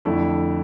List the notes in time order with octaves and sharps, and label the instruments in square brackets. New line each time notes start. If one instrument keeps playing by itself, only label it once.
[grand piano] F2 D3 A3 E4